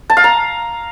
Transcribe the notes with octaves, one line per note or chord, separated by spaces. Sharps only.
A5
F5
A#5